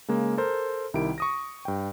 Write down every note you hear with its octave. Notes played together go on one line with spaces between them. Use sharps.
C#3 G#3 A#3
A4 A#4 C5
C2 D#3 E4 G4 D7
C#6 D#6 A#6
G2 G5